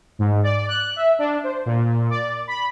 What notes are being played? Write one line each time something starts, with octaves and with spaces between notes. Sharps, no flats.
G#2
D5
F#6
E5
D4
C5
A#2
D5
B5